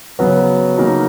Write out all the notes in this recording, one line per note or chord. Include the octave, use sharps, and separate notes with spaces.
C#3 F#3 B3 F#4
C#3 F#3 A#3 D#4 A#4